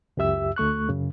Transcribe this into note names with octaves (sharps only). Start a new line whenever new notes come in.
C#2 F#2 G4 E5 E6
D2 A3 C#6 F#6
F#2 C#3